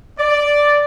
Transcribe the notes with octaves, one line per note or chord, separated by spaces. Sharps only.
D5